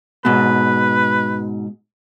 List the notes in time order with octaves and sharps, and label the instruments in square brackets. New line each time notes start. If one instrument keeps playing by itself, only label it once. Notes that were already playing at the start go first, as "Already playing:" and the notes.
[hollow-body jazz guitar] G#2 B2 [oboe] B4